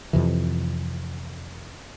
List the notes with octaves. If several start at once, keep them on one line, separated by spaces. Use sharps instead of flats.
F2 C3 E3